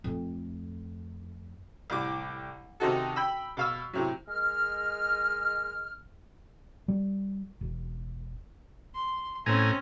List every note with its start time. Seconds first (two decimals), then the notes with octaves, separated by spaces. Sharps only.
0.04 F2 A3
1.90 C2 A2 G3 D6
2.80 C3 D#3 C4 D#4 F#4 A4
3.16 G5 B5 E6
3.57 B2 F5 E6
3.93 A2 C3 F#3
4.28 G#3 A#4 D#5 F6
6.88 G3
7.61 E1
8.94 C6
9.46 A2 C4 C#4 G#5 A#5